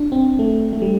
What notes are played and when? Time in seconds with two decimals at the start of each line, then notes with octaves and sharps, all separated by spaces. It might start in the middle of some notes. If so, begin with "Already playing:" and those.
Already playing: D4
0.12 C4
0.39 A3
0.73 A3
0.82 G3